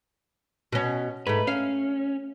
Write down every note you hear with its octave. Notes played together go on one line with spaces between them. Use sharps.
B2 C#4
G#2 A3 B4
C#4 F5